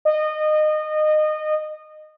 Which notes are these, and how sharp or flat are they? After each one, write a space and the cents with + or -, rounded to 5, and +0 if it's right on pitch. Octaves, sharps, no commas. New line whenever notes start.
D#5 -25